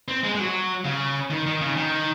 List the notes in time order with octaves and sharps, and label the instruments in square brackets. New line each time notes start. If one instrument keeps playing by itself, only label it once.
[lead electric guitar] C4
G#3
G#3
F#3
C#3
D#3
D#3
C#3
D#3